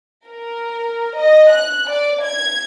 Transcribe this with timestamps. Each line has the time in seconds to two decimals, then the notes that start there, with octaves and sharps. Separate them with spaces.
0.26 A#4
1.17 D#5
1.51 F#6
1.89 D5
2.23 G#6